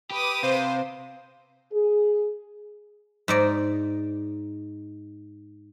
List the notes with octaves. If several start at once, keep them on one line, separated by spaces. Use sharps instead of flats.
G4 B4 D6 D#6
C3 C5 F5
G#4
G#2 D#4 D5